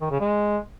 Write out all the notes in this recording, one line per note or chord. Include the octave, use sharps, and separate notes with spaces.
D#3
C#3
G#3